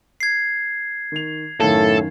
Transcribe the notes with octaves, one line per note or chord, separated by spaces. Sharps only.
G#6 C7
D#3 F7
F#2 A2 D#3 A4 F5